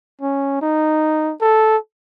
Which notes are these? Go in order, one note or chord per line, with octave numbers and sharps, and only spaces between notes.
C#4
D#4
A4